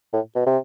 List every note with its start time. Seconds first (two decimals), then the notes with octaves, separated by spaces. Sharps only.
0.14 A2
0.35 B2
0.47 C3